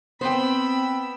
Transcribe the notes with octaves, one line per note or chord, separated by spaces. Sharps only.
B3 C4 C5 G5 B5 E6